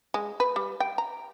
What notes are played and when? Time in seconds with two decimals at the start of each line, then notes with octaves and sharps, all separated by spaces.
0.14 G#3
0.40 B4
0.56 G3
0.80 G5
0.98 A#5